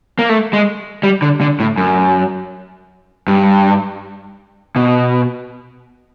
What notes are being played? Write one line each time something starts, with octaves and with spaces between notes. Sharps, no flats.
A#3
A3
G#3
G3
D3
D3
A2
F#2
G2
B2